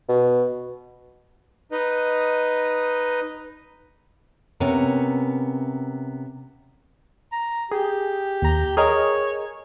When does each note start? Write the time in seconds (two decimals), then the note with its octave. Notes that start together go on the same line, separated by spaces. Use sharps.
0.09 B2
1.72 D#4 B4 D#5
4.60 C3 B3 C#4 A#4
7.32 A#5
7.71 G4 G#4
8.42 D#2 A#5
8.77 G#4 A#4 C#5 D#5